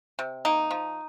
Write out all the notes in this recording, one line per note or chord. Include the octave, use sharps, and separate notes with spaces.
C3
A#3 D#4
F3